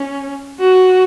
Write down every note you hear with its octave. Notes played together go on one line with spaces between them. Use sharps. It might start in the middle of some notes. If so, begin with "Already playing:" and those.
Already playing: C#4
F#4